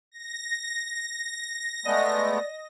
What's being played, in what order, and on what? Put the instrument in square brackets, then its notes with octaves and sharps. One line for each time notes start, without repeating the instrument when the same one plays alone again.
[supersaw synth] A#6
[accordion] G#3 A3 B3 [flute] D5 [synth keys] D#5